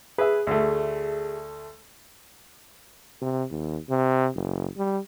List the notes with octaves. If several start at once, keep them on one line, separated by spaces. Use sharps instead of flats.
G#4 B4 E5
D2 A3
C3
D#2
C3
F#1
G3